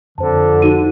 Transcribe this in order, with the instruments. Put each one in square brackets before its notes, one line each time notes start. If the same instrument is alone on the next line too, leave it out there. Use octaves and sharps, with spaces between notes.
[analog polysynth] F2 [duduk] D3 [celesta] C5 A5
[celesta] D#4 F#4 D#7